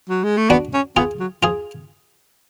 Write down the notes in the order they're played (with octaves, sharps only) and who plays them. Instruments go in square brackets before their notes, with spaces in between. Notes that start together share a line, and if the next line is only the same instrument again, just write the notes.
[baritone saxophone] F#3
G#3
A3
[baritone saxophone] B3 [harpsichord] D4 F#4
[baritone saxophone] C#4
[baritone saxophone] B3 [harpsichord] F4 G#4
[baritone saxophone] F#3
[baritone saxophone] F3 [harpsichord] F4 G#4